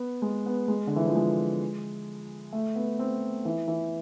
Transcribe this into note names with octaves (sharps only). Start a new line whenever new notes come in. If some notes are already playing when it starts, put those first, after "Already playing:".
Already playing: B3
G#3
B3
G#3
D3
E3
F3
G#3
A3
B3
C4
E3
E3